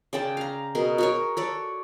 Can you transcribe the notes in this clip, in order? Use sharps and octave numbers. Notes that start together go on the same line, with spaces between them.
C#3 D5 G5 A5
F5 A#5
B2 G#4 A#4
F#4 A#4 C#5
A4 C#5 D5